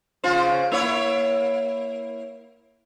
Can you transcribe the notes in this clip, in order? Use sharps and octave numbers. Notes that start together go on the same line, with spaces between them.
C#3 F4 C5
A#3 E4 C#5